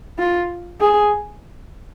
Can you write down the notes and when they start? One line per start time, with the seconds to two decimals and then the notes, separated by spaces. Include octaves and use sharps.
0.19 F4
0.80 G#4